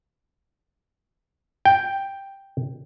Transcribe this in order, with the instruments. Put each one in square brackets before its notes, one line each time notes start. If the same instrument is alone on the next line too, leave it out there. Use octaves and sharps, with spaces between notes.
[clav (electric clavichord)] G5